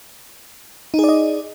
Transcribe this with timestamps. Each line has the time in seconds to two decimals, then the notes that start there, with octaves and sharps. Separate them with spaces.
0.94 D#4
0.99 G#4
1.04 D5
1.09 D#5